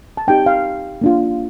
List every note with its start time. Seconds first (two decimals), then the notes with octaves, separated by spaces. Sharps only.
0.17 A5
0.27 C4 D#4 G4 G5
0.46 F5
1.01 A#3 D4 F4